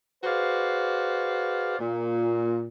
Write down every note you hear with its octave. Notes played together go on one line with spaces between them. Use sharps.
F#4 G#4 B4 C5 D5 F5
A#2